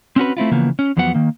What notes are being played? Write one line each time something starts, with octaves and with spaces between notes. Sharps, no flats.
C4 C#4 F#4 B4
A3 C4 E4 F4
C#3 E3 F3 A#3 B3
C#4
E2 F3 F#3 B3 F#5
D#3 A#3